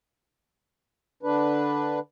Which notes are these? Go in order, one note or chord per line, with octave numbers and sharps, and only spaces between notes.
D3 D4 B4